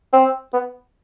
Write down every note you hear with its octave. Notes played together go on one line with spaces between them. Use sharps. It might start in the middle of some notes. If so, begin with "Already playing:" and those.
C4
B3